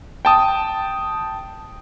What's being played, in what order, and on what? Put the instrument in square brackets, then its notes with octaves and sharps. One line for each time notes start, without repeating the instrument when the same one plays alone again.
[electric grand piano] G5 A5 D#6